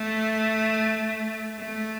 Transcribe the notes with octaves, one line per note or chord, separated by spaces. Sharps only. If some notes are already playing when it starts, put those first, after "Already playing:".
Already playing: A3
A3